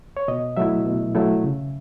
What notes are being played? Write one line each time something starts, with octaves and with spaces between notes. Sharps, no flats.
C#5
B2 D#5
F#3 A3 E4 E5
B2
F#3 A3 E4
C#3